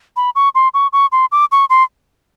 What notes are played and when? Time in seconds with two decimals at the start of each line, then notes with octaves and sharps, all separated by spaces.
0.17 B5
0.36 C#6
0.55 C6
0.74 C#6
0.93 C#6
1.12 C6
1.32 D6
1.52 C#6
1.70 C6